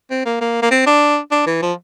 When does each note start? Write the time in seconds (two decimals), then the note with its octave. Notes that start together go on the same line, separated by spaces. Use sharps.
0.11 C4
0.25 A#3
0.41 A#3
0.62 A#3
0.71 C4
0.86 D4
1.31 D4
1.47 E3
1.62 F3